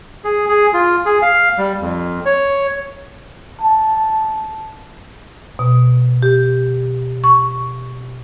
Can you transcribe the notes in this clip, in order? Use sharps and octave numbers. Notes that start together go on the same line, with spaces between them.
G#4
G#4
F4
G#4
F5
G3
F2
C#5
A5
B2
G4
C#6